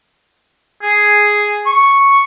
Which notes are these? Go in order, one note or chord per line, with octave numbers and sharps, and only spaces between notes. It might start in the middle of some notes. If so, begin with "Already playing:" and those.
G#4
C#6